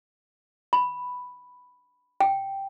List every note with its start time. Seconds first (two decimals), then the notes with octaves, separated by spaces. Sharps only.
0.73 B5
2.20 G5